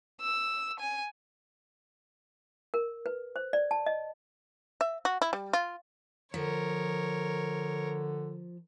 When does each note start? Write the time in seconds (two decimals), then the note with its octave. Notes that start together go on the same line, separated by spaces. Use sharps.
0.21 E6
0.80 G#5
2.74 A#4
3.06 B4
3.36 C5
3.53 D5
3.71 A5
3.86 D#5
4.81 E5
5.05 F#4
5.22 E4
5.33 G3
5.53 F4
6.34 D3 F3 A#4 C#5